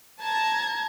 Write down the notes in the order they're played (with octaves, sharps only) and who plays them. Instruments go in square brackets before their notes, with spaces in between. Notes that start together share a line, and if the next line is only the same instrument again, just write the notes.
[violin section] A5 [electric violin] A#5 G#6